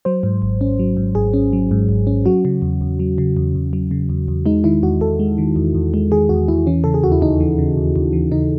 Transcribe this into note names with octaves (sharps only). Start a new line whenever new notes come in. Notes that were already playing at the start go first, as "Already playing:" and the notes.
F#3 C5
G#2
G#1
C#4
F#3
G#2
G#1 G#4
C#4
F#3
G#2
G#1
C#4
F#3 F#4
C#3
E2
E2
F#3
C#3
E2
E2
F#3
C#3
E2
E2
G#3 D#4
D#3 E4
E2 F#4
E2 A4
G#3
D#3
E2
E2
G#3
D#3 G#4
E2 F#4
E2 E4
E3 C#4
C#3 A4
G#4
D#2 F#4
E4
D#2 D#4
E3
C#3
D#2
D#2
E3
C#3 D#4